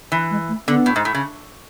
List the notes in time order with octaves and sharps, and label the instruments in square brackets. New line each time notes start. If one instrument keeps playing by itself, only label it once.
[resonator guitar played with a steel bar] E3
[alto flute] G#3
A3
[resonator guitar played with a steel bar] D3 [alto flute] B3
[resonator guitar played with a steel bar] A2
G#2
A2
C#3